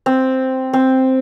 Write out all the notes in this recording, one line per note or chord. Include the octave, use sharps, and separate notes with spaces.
C4
C4